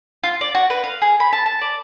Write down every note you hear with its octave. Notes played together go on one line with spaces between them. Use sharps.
F4
D5
F#4
B4
F5
G#4
B5
A5
A5
D5